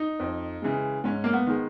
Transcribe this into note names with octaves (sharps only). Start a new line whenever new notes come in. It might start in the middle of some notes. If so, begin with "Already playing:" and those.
Already playing: D#4
F2
C#3 E3 G#3
G#2 C#4
A#3
B3
D#3 G#3